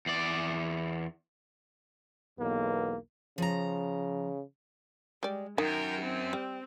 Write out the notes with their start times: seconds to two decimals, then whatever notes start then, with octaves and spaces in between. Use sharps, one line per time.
0.06 E2 D5
2.39 B1 E2 A#3 B3
3.38 C#3 F3 A#5
5.23 G3 G#3 D5
5.58 F#2 D#3 A#4 G5
6.02 C4
6.33 G3